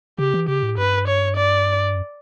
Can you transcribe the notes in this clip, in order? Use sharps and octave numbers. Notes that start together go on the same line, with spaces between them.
C#3 G4
E3
C#3 G4
A2
G2 B4
C#5
D5
F#2